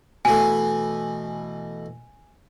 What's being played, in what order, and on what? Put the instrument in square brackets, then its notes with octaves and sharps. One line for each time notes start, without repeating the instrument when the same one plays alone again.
[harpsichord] B2 E3 A3 [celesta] G#5